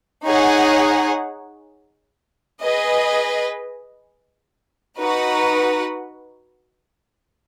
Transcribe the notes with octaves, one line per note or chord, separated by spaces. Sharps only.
D#4 G#4 C#5 F#5
G#4 B4 D#5
D#4 F#4 B4 F#5